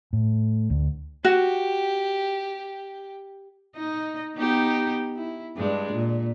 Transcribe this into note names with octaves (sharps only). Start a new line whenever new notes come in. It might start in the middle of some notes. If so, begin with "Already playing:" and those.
A2
D2
F#4 G4
D#4 D#5
B3 D#4 G4
E4
G2 G#3 D4
A#2